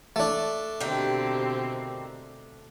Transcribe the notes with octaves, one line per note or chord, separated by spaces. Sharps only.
A3 D4
B2 D3 D#3 C4 G4